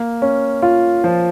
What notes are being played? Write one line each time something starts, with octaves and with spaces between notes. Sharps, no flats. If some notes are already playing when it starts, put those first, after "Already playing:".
Already playing: A#3
C#4
F4
F3